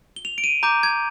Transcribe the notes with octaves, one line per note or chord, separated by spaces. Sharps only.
G7
F7
D7
D#7
A#5 D6 G6
G#6